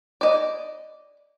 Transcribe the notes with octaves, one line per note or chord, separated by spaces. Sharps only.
D5 D#5